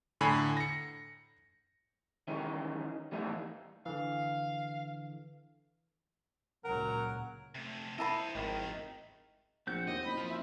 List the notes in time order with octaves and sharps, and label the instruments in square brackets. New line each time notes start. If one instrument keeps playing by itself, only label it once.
[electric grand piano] A2 D3 G#5 A#5 B5 C7
A#6 C#7
[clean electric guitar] D#3 E3 G3 G#3 C#4 D#4
E3 G3 A3 B3 D#4 E4
[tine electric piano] D3 E3 [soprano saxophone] F5
[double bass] C#2 A#2 [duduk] F#3 [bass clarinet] A#4 [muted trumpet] F#5
[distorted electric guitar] C3 A3
[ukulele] E4 A5 B5 [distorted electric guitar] C5 D#5
[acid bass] G#1 [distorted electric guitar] F2 A3 [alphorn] D#3
[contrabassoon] A#1 [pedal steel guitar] C4 G6 [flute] F#5
[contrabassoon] D#2 [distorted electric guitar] D#5
[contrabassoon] F#1 [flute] B5
[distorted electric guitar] F3 F4
[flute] E5